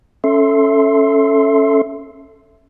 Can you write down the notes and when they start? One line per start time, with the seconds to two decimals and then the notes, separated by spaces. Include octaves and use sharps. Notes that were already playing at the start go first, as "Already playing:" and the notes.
0.24 C#4 A4 E5 C6